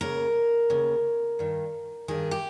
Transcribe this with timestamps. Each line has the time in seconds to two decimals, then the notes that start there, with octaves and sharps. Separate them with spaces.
0.01 D#2 C#3 A#4
0.70 D#2 C#3
1.39 G2 D#3
2.08 G2 D#3 G#4
2.31 G4